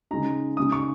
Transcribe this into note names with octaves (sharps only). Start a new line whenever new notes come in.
C#3 G#3 D#4 A#5
C#3 G#3 D#4 D#6
C#6